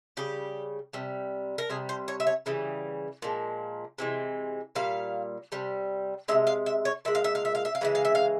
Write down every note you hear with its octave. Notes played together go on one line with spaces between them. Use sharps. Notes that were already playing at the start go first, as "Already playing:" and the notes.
C#3 G3 G4
C3 G3
A#4
C3 G3 G#4
C5
C#5
E5
C#5
C#3 E3 G3
A#2 F3 G#3
C3 E3 G#3
A#2 G3 F5
C3 G3
C3 E3 G#3 E5
F5
E5
C#5
A#2 G#3 E5
F5
E5
F5
E5
F5
E5
F5
C#3 E3 G#3 E5
F5
E5
F5